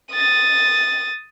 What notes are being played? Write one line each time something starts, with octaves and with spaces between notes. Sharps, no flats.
D#6 A6